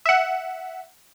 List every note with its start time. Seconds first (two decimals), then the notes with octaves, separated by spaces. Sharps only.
0.06 E5 F#5